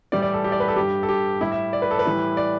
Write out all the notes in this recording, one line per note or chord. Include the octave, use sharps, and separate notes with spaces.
A2 E3 G3 D5
D5
A4
G4
D5
B4
A4
G2 G3 G4
A4
G4
A2 G3 E4
E5
D5
B4
A4
B4
A2 E3 G3
D5